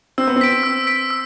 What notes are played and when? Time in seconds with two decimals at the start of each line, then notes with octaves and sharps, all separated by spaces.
0.18 C4 E6
0.27 B3
0.36 C4
0.41 B6 D7
0.64 E6
0.87 B6 D7
1.10 E6